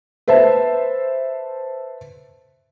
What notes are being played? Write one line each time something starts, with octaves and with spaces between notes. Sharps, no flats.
B4 C5 E5 A5